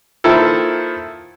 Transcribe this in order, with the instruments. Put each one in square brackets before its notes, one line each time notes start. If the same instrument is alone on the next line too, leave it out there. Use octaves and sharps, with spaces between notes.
[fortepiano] D#3 F3 A#3 E4 F4 A4